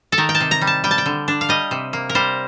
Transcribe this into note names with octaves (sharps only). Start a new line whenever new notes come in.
A4
D#3 A#4
G5
A5
C3
A#5
G3
A5
G3 G5
A5
G5
D3
D4
F5
G3 D#5
C3
A#3
A#4
G3 C5